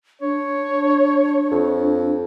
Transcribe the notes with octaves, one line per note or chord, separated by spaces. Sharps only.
D4 C#5
F2